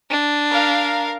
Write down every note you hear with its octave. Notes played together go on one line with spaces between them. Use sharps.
D4
A#4 F5